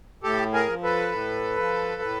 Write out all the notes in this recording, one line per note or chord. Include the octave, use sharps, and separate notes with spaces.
A2 G4 A4
G#4 A#4
F3
A4 B4
A2
F3
A2